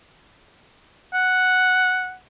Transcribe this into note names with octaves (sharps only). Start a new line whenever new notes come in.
F#5